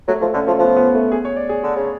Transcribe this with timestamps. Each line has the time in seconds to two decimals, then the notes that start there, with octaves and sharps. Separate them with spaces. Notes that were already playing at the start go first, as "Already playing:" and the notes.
0.08 F#3 A3
0.21 F3 A3
0.33 D3 C#4
0.47 F3 A3
0.59 F3 B3
0.76 B3
0.95 A3
1.12 G#4
1.25 C#5
1.36 D5
1.49 G#4
1.63 D3
1.76 C#3